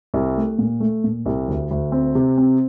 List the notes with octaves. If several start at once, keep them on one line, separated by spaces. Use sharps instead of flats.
C2
A3
A#2
A3
A#2
C2
D2
D2
C4
C3
C4